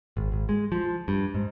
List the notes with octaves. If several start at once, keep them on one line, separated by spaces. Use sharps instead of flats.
G#1
G#1
G#3
F3
G2
G#2